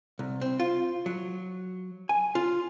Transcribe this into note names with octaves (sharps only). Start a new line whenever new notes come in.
C2
C4
F4
F#3
G#5
F4